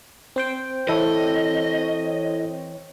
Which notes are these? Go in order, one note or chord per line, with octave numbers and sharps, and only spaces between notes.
C4 C5 G5
E3 E4 A4 C#5 D#5